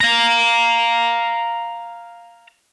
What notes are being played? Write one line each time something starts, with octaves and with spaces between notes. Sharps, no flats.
F5 A#5